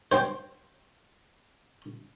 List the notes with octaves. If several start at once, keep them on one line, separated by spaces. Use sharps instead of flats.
C5 G5 C6